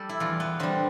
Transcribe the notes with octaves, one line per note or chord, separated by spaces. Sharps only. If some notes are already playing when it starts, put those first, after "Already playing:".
Already playing: G3 G4 A4
E4
E2 F4
B3
D3 G3 C4